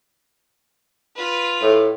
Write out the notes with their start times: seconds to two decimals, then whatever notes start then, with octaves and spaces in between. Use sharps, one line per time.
1.15 F4 B4
1.62 A2